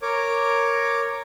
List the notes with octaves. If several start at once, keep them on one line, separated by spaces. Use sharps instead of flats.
A#4 C#5 D6